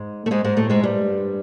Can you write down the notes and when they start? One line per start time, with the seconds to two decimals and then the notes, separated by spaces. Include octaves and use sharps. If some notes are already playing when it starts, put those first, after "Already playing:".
Already playing: G#2 G#3
0.26 A3
0.31 G#2 G#3
0.44 G#2 G#3
0.57 A2 A3
0.70 G#2 G#3
0.83 G2 G3